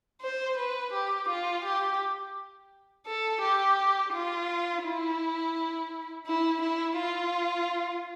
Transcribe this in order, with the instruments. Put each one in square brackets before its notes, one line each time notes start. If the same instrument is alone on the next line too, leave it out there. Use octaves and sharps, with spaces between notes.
[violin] C5
B4
G4
F4
G4
A4
G4
F4
E4
E4
E4
F4